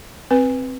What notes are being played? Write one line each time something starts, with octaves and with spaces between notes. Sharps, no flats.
C4 B4